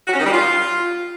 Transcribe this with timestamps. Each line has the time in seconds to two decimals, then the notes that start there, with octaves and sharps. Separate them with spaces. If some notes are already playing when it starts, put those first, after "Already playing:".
0.07 F#4
0.13 C#4
0.19 D#3
0.25 G3
0.31 F4